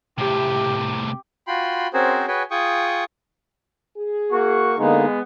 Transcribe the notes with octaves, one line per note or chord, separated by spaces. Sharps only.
A2 C3 G4
F4 F#4 G5 B5 C6
C4 C#4 F#4 G#4 A#4 C5
F#4 G#4 B4 C#5 G5 G#5
F4 G#4 G5 C#6 D#6
G#4
A#3 F#4 C#6
D3 G#3 A#3 B3 D#4